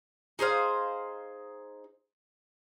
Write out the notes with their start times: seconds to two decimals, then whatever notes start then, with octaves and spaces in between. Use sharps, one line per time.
0.39 D#4 G#4 C5 F5